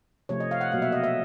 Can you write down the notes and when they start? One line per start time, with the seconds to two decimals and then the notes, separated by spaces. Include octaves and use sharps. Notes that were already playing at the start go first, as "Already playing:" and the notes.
0.29 C3 F3 A3 C#5
0.40 D#5
0.51 F5
0.61 F#5
0.72 B2 F#3 A#3 F5
0.82 E5
0.92 D#5
1.04 E5